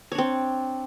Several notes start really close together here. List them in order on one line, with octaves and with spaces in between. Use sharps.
C#5 D4 C4